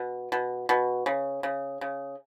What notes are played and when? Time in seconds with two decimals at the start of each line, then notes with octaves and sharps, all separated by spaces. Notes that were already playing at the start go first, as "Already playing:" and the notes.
Already playing: B2
0.32 B2
0.69 B2
1.06 C#3
1.43 C#3
1.81 C#3